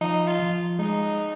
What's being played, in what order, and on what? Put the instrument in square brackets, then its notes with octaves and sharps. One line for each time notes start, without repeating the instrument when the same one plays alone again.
[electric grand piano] F3 [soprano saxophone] D#4
[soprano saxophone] F4
[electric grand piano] F3
[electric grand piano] G#3 [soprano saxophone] D#4